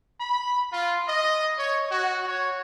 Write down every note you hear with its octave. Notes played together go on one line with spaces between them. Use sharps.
B5
F4
D#5
C#5
F#4
C#5